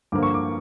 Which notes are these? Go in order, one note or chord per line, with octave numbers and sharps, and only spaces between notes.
G2 D3 F3 A#3 D6
C#6
D6